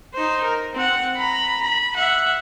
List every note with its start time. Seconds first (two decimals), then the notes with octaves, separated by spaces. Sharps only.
0.14 D#4 C5
0.44 A#4
0.74 C4 F#5
1.17 A#5 B5
1.64 B5
1.96 E5 F#5